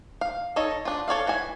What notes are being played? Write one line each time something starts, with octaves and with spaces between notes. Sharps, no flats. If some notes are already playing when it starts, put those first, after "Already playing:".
F5
D#4 A4 C#5 D#5
D4 F4
A4 C#5 D5 F5
E3 F#4 G#5